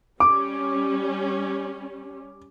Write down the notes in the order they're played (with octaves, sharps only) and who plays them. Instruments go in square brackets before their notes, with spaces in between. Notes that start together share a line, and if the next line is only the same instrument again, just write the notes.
[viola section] G3 C#4 [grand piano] D6